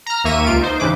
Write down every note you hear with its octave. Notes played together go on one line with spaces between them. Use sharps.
A#5 F6
D#2 A#3 E5 C#6 D#7
C#2 F4 D7
D#4 C5
G2 C#3 E3 B4 D6